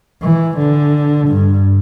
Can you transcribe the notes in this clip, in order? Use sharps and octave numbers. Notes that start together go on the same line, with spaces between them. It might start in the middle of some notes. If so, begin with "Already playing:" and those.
E3
D3
G2